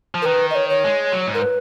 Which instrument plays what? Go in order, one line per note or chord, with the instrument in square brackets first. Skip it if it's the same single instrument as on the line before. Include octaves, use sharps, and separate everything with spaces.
[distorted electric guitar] F3
[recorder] A#4
[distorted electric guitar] D#3 [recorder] B4
[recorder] D#5
C#5
C#5
[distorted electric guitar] G#3
F#3
G#2
[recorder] A#4
B4